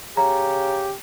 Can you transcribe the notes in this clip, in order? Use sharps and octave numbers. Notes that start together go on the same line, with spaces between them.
C#3 G4 A#5